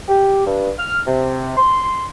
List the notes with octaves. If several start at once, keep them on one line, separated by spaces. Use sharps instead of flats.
G4
G2
F6
C3
C6